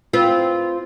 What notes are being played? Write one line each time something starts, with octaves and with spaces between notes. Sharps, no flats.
C4 F4 B4